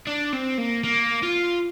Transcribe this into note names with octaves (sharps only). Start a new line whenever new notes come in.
D4
C4
A#3
A#3
F4